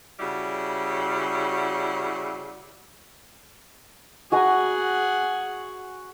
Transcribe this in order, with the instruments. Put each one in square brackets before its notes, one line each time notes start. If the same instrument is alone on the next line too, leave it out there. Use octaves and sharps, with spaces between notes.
[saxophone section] C#3 G3 E4 F#4
[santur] F#4 G#5 A#5 [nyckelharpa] G#4 F#5